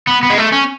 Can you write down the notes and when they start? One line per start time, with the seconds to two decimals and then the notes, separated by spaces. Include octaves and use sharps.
0.07 B3
0.23 B3
0.30 G#3
0.37 A3
0.52 C#4